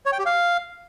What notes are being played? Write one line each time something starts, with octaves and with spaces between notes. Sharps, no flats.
C#5
G5
G4
F5